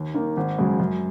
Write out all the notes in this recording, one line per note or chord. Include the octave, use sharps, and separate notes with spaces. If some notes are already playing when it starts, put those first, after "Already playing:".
Already playing: D#2
D#3 A#3
G#1
F#2 C#3 G#3
F#2